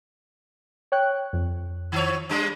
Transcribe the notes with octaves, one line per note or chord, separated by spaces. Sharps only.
C#5 G5 F#6
F2
D#3 F3 C#5
G3 G#3 D4